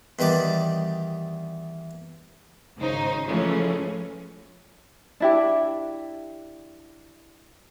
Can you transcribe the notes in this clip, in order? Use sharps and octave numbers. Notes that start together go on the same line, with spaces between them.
E2 D#3 G3 D5
G#1 C#3 D#4 C5
C#3 E3 F3 G#3 A3 C#4
D4 E4 G4